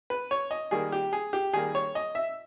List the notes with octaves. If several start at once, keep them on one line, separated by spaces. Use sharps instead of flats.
B4
C#5
D#5
D#3 G3 A#3 G#4
G4
G#4
G4
D#3 G3 A#3 G#4
C#5
D#5
E5